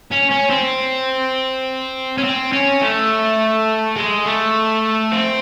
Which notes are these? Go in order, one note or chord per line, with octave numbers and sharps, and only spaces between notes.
C#4
C#4
C4
C#4
C4
C#4
A3
G#3
A3
C4